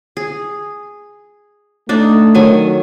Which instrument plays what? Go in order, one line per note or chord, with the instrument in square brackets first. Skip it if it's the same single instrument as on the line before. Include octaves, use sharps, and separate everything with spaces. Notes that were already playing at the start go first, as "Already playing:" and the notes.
[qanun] G#4
[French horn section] A3 [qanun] D4 D#4 D5
[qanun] D#3 F#3 G#5